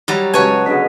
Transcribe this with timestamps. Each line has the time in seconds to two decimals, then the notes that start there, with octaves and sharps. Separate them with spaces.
0.08 F#3 G3 D#4 G4 C#5
0.34 C#3 F#3 G#3 B4 C#5 G#5 A5
0.66 B2 D3 G#4 D#5 B6